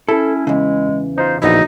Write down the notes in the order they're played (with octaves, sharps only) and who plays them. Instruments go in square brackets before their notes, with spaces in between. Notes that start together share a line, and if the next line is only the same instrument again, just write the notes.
[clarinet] C#4 [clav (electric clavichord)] E4 [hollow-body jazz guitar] A4
[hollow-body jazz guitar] E2 C#3 [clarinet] G#3
[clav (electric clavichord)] D#4 F4 [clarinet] C5
[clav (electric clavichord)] A#1 B3 E4 [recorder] D#4 [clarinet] F#4